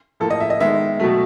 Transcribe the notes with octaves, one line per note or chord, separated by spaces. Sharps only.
A2 F3 A#3 A4
D#5
E5
D#5
D#3 G#3 B3 E5
B2 F#3 A3